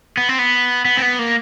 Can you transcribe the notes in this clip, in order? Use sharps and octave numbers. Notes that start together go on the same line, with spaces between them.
B3
C4
B3
B3
C4
B3
A#3